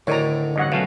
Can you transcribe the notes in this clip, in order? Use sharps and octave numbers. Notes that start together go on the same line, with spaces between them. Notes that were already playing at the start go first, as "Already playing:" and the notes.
D2 A2 D3 D#3 C#5 D5 A#5
A1 G2 C#5 D#5 F#5
B1 B2 A3 C#4 F5